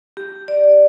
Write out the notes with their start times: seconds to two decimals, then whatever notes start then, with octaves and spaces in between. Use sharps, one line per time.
0.17 G4
0.48 D5